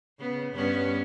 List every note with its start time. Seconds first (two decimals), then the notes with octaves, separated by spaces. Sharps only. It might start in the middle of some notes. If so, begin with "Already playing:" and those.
0.19 C#3 B3
0.53 G2 B3 C#4